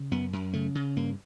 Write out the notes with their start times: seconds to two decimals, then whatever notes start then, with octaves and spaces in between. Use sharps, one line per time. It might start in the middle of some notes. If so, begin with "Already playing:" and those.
Already playing: C#3
0.11 F#2 B3
0.33 F#2
0.53 C#3 A3
0.75 C#3
0.96 G2 A#3